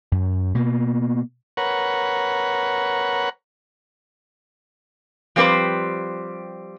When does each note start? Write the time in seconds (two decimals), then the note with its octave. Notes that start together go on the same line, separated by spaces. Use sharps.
0.12 F#2
0.55 B2 A#3
1.57 A#4 B4 C#5 F#5
5.36 F3 G3 C4 G4 B4 C5